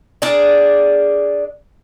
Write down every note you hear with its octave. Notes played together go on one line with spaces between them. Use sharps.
D4 G#4 A#4 D5